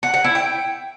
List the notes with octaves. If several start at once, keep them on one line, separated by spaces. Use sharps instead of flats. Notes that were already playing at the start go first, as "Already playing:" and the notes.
F#5
F#5
E4
G5